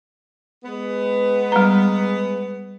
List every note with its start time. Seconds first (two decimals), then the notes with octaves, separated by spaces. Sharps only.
0.64 G#3 B3
1.52 G3 A#5